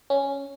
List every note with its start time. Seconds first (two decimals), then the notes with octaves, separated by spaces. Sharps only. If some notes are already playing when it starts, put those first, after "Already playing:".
0.10 C#4